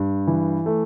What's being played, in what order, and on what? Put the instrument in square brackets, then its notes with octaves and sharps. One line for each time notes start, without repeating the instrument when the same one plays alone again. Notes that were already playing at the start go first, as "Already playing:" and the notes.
Already playing: [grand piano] G2
E3
A3